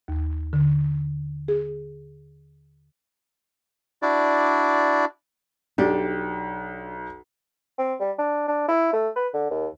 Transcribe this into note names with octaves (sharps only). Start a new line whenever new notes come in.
D#2
D3
G#4
D4 E4 F#4 D5
B1 D4 G4
C4
G3
D4
D4
E4
A3
B4
D3
D#2